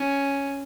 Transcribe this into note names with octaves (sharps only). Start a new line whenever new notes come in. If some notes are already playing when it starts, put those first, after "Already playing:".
Already playing: C#4